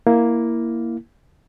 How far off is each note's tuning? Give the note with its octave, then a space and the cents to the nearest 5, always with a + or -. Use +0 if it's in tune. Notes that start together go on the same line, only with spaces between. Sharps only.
A#3 +0 E4 +0